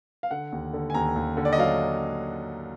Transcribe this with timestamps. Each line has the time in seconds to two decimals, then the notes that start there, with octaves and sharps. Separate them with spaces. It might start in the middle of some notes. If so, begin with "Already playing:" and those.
0.23 F5
0.31 D3 F#5
0.52 D#2
0.73 D3
0.90 G#5
0.94 D#2 A#5
1.16 D#2
1.37 D3
1.45 D5
1.53 D#5
1.58 F#3 F5